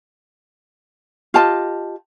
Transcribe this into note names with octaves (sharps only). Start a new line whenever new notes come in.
F4 G4 D#5 A5